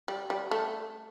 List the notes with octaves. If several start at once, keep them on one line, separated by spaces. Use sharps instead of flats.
G3
G3
A3